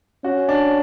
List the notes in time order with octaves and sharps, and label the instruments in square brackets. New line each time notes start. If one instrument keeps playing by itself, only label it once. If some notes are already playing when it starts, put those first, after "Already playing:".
[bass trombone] C#4 [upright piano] F#4
[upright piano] D4